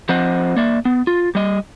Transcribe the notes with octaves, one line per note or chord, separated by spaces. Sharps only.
F3 C4 C5 D#5 F#5
A#3 D5 E5
B3
F4
G3 D#5